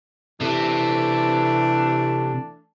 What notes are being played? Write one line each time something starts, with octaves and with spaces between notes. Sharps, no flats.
C3 E3 A3 D4